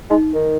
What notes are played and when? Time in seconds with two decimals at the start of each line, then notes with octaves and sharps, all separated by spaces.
0.10 G#3 D#4
0.34 D#3